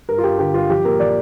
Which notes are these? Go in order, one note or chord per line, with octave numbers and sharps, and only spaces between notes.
G2 A#4
F4
G2 G4
D3 G4
G2 F4
F3 G4
A#2 A#4
F3 D5